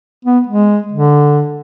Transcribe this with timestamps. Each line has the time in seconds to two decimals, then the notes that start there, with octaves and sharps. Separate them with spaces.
0.25 B3
0.47 G#3
0.92 D3